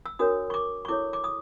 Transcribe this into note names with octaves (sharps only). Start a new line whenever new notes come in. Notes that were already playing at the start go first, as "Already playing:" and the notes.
E6
D4 F#4 A#4 C#5 D#6
C#6
D6
C#6
E4 A4 C#5 D6
D6
D#6